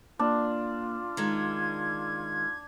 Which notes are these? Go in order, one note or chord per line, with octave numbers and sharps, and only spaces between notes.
A#3 D4 F4
D#3 G#3 G#6